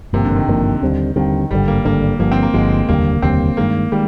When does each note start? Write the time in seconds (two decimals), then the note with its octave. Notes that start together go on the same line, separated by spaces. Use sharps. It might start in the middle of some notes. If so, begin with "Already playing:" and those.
0.13 G#1 G2 C3 F3 A#3
0.25 D3
0.36 D#3
0.47 G#1 G2 F3 A#3
0.82 D#2 D3 G3 C4
1.16 D#2 D3 D#3 G3 C4
1.51 G#1 G2 D3 G3
1.68 A#3
1.85 G#1 G2 D3 A#3
2.19 G1 G2 F3 A#3
2.32 C4
2.43 A#3
2.54 G1 G2 F3 G#3
2.89 F1 D#2 D3 G3 A#3
3.22 F1 D#2 D3 G3 C4
3.57 G2 D#3 G#3 A#3
3.92 D#3 G3 G#3